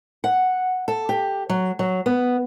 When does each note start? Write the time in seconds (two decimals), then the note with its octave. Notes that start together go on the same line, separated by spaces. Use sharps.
0.24 F#5
0.88 A4
1.09 G4
1.49 F#3
1.79 F#3
2.06 B3